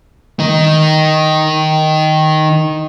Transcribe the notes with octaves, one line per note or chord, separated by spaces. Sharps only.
D#3 D#4